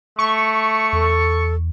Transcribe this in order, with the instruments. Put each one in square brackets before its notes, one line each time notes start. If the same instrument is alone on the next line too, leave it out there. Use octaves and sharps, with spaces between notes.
[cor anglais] A3 [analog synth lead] C#6
[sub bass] E2 [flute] A4